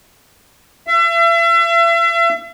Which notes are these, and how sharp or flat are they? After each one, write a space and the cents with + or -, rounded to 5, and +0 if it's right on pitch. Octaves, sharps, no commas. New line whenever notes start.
E5 +40